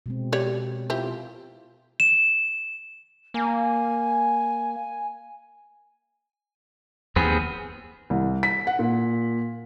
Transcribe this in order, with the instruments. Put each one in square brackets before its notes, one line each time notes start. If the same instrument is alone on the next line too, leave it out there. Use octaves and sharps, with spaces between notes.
[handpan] B2 G#3 C4
[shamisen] G4 C#5 D5
[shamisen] C4 E4 G4 [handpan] F4
[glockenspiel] E7
[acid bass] A#3 [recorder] G#5
[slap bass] D#2 [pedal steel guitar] B3 C4 G#4
[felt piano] C2
B6
F#5
A#2